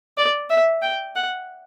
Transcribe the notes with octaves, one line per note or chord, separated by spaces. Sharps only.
D5
E5
G5
F#5